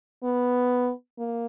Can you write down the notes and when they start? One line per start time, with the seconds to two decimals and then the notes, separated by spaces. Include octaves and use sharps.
0.23 B3
1.18 A#3